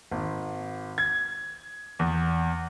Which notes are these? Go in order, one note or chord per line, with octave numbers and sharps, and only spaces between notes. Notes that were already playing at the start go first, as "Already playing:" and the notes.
G#1
G#6
E2